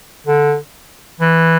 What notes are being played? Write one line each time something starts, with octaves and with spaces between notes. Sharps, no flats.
D3
E3